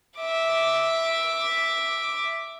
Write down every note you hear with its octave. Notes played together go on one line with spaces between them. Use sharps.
E5 D6